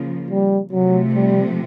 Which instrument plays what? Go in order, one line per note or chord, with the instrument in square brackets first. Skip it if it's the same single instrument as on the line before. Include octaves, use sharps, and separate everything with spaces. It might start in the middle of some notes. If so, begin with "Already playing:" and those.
Already playing: [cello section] C#3 F3 A#3
[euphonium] G3
[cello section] C3 F3 A3 [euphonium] F#3
[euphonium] G3